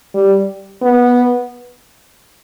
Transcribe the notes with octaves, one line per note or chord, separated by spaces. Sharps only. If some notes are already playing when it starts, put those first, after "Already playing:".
G3
B3